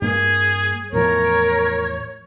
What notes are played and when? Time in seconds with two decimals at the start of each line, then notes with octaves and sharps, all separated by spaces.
0.02 G2 A#3 G#4
0.92 E2 A2 F3 A#4 C#5